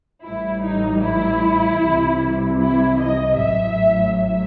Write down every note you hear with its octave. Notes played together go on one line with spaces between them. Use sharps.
A1 A2 E3 G3 E4
D#4
E4
C2 C3 E3 G3
E4
D#5
A1 A2 F#3 E5
E5